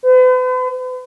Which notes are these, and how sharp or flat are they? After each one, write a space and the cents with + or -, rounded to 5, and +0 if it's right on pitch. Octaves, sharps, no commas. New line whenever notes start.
B4 +45